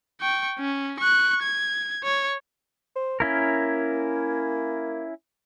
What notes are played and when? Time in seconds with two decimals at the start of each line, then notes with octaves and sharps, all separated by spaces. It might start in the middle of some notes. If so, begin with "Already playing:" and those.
0.21 G5 C#6
0.59 C#4
1.00 C#6 F#6
1.43 G#6
2.04 C#5
2.96 C5
3.20 A#3 C#4 E4 A#4